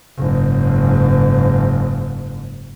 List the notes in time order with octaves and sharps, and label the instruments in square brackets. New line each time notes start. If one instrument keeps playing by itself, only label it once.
[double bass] F#1 G#2